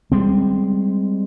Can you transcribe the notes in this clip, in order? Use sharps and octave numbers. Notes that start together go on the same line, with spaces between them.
G3 G#3 C4